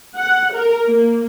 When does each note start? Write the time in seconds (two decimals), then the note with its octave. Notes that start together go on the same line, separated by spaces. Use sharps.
0.16 F#5
0.53 A#4
0.87 A#3